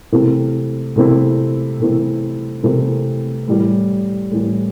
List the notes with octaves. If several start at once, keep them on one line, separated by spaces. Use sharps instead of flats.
C3 E3 A3 C4 E4
C3 E3 A3 C4 E4
C3 E3 A3 C4 E4
C3 E3 A3 C4 E4
A2 E3 G3
A2 E3 G3